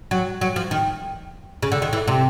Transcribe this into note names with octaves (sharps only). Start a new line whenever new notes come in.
F#3
F#3
F3
D#3
C#3
D3
D#3
E3
C3